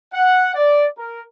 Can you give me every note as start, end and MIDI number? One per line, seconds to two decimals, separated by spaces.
0.14 0.52 78
0.55 0.86 74
0.97 1.22 70